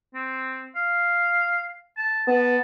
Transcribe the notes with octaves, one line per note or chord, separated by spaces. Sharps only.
C4
F5
A5
B3 A5